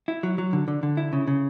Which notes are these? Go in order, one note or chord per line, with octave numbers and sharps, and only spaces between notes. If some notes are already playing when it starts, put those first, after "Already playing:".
E4
F#3
F#3
D3
D3
D3
E4
C#3
C#3